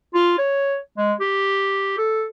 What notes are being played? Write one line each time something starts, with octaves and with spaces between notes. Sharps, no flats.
F4
C#5
G#3
G4
A4